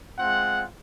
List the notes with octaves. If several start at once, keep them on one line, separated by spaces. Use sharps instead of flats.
G#3 C4 F4 F#5